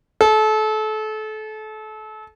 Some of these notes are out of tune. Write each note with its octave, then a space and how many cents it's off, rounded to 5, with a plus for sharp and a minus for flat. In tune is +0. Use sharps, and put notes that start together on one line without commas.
A4 -30